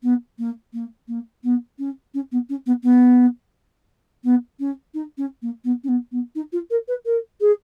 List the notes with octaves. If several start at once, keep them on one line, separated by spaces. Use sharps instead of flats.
B3
A#3
A#3
A#3
B3
C#4
C#4
B3
C#4
B3
B3
B3
C#4
D#4
C#4
A#3
B3
C#4
B3
B3
D#4
F4
A#4
B4
A#4
G#4